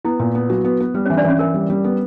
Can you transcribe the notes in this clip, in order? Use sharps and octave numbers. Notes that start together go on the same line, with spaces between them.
B3 E4
A#2
B3
F#3
B3
B3
G3 B4
E3 C#4 C#5
D4 D5
E3 C#4 C#5
E3 A#4
G3
G3
B3